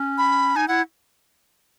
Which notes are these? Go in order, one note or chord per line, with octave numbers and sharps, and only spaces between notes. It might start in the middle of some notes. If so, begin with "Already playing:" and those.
Already playing: C#4
B5
D#4 G#5
E4 F#5